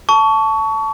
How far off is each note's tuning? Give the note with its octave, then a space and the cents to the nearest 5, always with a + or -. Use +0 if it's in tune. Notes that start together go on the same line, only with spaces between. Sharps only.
A5 +0 C#6 +25